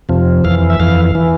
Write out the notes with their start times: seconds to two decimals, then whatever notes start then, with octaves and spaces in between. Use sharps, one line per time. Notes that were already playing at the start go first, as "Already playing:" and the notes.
0.09 F2 C3 F3
0.44 F2 E3 F5
0.70 E5
0.80 F2 E3 F5
1.15 E3